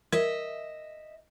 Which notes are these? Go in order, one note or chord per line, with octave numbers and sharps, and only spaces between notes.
A#4 D#5 E5